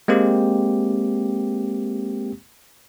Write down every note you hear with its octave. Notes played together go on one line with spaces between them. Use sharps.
G#3 A#3 C4 G4